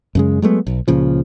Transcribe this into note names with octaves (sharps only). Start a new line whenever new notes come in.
F#2 C#3 G#3
F#3 G#3 A3 B3
B1
C#2 A#2 C#3 F3